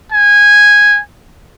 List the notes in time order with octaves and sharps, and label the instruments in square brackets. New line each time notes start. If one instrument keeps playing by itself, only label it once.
[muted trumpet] G#5